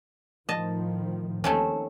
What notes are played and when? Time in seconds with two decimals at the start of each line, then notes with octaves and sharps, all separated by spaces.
0.49 A2 D#3 F3 D#5 A5
1.44 D#2 D#3 A3 C4 C#4